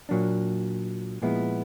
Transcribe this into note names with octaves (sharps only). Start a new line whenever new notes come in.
A#2 F#3 A#3 D4
A#2 F3 G#3 B3 E4